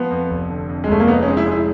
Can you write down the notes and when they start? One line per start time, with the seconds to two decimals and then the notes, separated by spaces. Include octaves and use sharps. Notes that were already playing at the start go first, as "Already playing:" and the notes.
Already playing: F3 B3
0.11 F2
0.30 F1
0.50 D3
0.69 F2
0.84 G#3
0.88 F1 A3
1.00 A#3
1.07 B3 D#4
1.23 C#4
1.28 G#3
1.37 E4
1.47 G#3 E4